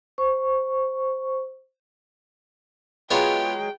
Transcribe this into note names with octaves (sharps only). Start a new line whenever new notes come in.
C5 C#6
F#3 G#3 B3 F4 C#5 G5